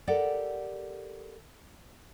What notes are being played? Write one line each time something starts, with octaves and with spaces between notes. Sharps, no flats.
G4 A4 A#4 D5 F#5 G5